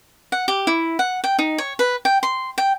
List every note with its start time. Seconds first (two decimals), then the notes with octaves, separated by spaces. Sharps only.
0.32 F#5
0.48 G4
0.67 E4
0.99 F#5
1.24 G5
1.39 D#4
1.58 C#5
1.79 B4
2.05 G5
2.23 C6
2.58 G5